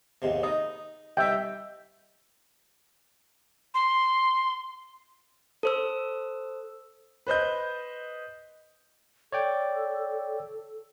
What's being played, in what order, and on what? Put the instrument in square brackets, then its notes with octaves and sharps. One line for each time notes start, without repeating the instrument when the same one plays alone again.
[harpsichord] D#2 G#2 C3
[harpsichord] D#4 [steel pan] D#5
[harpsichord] C2 D#4 [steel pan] E5 G5
[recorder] C6
[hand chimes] A4 C5 E6
[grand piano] B4 C5 D#5 G6
[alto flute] A4 [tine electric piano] C#5 D5 G5